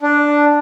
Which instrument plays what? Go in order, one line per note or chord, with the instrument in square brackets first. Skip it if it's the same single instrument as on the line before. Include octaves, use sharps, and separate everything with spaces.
[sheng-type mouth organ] D4